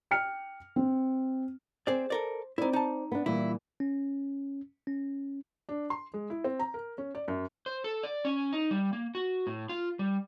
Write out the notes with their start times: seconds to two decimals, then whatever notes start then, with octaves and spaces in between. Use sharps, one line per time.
0.11 G5 F6 C#7
0.76 C4
1.87 C4 G#4 C5 D5
2.10 A4 A#4 D5
2.58 C4 D#4 E4 D5
2.73 D#4 A5
3.12 B3 D4
3.26 A#2 E3 G3 E4
3.80 C#4
4.87 C#4
5.69 D4
5.90 C6
6.14 G#3
6.30 E4
6.44 C4
6.59 A#5
6.74 A#4
6.98 C#4
7.15 D5
7.28 F#2
7.66 C5
7.84 A4
8.03 D5
8.25 C#4
8.53 D#4
8.71 G3
8.93 A#3
9.15 F#4
9.47 A2
9.69 F4
9.99 G3